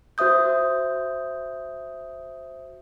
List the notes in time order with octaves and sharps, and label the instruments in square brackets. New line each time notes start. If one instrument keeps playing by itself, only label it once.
[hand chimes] F#4 C5 E5 D#6 G6